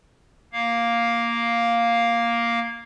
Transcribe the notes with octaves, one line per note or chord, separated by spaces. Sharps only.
A#3 F5